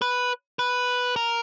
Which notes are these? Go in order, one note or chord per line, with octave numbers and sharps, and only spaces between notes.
B4
B4
A#4